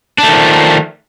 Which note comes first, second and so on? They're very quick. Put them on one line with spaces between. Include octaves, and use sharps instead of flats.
D4 A3 D#3 F3